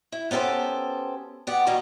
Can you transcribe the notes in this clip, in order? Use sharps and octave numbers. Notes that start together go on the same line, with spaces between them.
E4
B3 C#4 G4 A4 C5
B3 G4 D5 F#5
B2 D#3 G3 A#3 D#5